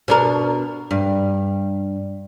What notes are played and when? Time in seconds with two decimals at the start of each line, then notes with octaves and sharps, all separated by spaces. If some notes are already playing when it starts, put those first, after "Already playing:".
0.08 B2 D4 A#4
0.91 G2